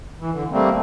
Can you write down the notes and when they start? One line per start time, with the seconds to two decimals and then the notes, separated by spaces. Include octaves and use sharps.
0.20 E3
0.32 D3
0.51 G3 A3 A#3 C4